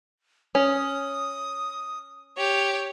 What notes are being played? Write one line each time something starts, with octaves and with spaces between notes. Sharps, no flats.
C#4 D#6
G4 C#5